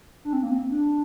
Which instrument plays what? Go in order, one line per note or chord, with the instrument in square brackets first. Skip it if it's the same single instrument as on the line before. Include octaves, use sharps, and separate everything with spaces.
[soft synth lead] D4
C4
A#3
C4
D4